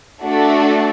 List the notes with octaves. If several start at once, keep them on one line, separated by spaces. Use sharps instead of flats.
A3 D4 F#4 A4